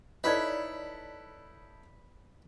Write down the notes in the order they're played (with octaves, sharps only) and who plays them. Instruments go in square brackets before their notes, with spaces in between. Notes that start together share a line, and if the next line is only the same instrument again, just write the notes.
[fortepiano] D#4 E4 A4 [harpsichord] B4 [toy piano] C#5 D5